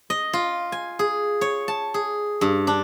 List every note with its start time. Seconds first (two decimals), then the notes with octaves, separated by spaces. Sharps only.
0.10 D#5
0.33 F4
0.72 G#5
0.99 G#4
1.41 C#5
1.68 A5
1.94 G#4
2.41 G2
2.67 D4